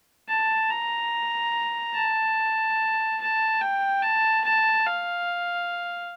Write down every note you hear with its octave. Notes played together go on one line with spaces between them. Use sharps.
A5
A#5
A5
A5
G5
A5
A5
F5